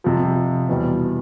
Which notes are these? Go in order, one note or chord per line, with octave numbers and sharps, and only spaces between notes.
F2 C3 F3
E2 B2 G3